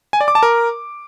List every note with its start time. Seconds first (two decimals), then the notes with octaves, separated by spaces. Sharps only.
0.13 G#5
0.21 D5
0.28 D6
0.35 A5
0.43 A#4